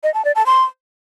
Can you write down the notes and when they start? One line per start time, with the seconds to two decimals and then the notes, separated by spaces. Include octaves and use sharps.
0.03 D#5
0.14 A5
0.25 D5
0.35 A5
0.46 C6